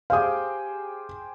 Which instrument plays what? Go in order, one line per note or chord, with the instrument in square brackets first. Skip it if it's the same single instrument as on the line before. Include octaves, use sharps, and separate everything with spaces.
[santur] G4 G#4 C5 [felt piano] F5 D#6